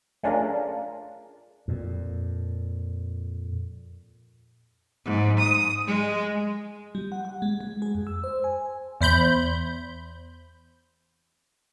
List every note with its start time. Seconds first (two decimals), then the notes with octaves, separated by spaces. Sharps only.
0.23 A3 C#4 D4 F4 G#4 A#4
1.68 F2 A#2
5.04 G#2
5.39 D#6
5.86 G#3
6.95 G3
7.12 F#5
7.25 F#5
7.42 G#3
7.61 G#3
7.82 G#4
7.95 F2
8.07 E6
8.24 C5
8.44 G#5
9.01 E2 C5 B5 G6